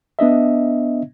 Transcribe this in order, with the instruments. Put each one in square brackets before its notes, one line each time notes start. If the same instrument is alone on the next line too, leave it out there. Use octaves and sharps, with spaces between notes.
[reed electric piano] B3 D4 D#5 E5